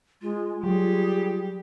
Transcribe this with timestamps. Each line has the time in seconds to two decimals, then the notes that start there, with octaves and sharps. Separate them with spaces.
0.22 G#3 F4
0.64 F#3 G3 G4 G#4